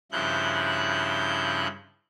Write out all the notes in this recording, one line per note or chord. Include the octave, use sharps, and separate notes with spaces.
G2 C#3 F3 E4 F#6 G6